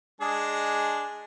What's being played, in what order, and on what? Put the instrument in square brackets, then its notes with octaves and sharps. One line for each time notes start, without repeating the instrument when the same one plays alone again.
[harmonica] G#3 D4 G#4